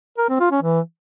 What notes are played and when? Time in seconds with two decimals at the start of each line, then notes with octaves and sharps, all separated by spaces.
0.18 A#4
0.29 C4
0.40 F4
0.51 C#4
0.62 E3